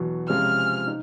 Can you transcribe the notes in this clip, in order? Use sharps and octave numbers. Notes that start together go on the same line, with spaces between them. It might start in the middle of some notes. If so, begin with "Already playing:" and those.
Already playing: E2 B2 F#3
C3 F3 G#3 C#4 F4 F6
D#4